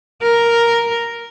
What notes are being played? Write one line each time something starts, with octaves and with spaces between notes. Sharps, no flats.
A#4